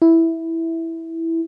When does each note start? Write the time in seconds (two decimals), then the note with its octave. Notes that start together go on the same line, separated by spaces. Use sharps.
0.02 E4